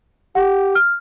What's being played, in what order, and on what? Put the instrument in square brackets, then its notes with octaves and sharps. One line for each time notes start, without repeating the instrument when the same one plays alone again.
[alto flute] G4 [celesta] F#5
[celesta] F6